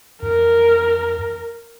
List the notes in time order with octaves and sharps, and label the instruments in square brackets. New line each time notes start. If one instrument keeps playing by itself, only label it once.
[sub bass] F2 [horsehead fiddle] A#4